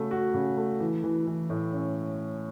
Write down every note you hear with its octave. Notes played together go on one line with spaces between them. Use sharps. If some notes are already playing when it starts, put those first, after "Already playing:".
Already playing: C#3 A3 F#4
F#4
C#3
A3
E3
E3
E3
A2
C#4